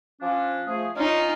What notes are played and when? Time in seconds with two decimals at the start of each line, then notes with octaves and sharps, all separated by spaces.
0.21 F3 C#4 D4
0.67 F3 A3 G#4
0.97 C#4 D#4 F4